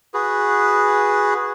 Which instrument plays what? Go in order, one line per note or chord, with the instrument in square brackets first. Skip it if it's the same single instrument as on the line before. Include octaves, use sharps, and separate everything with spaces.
[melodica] F#4 G#4 B4